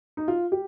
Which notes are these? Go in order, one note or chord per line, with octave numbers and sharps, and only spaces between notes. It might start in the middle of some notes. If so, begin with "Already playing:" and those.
D#4
F4
G4